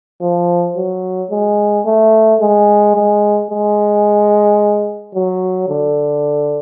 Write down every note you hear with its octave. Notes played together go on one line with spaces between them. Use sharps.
F3
F#3
G#3
A3
G#3
G#3
G#3
F#3
D3